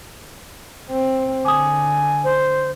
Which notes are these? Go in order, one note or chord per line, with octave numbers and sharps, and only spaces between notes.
C4
D3 G#5 D6 D#6
C5